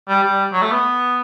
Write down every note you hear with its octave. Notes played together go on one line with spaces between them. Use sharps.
G3
G3
F#3
A3
B3